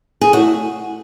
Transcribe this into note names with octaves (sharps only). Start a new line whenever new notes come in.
G#4
A2 F#4